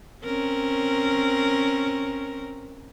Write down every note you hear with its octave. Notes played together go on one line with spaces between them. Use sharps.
C4 C#4 A#4